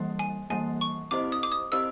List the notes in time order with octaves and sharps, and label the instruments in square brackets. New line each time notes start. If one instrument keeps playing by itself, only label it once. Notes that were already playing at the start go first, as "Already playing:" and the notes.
Already playing: [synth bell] E3 G3 A#3
[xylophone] G#5
[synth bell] E3 G3 A#3 [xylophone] G#5
[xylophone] C#6
[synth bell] C4 E4 G4 C5 D#5 [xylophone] D6
[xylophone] D#6
D6
D#6
[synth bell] C4 E4 G4 C5 D#5 [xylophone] E6